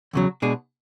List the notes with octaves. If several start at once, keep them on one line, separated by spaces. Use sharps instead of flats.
E2 C#3 F#3
B2 G#3 D4 G#4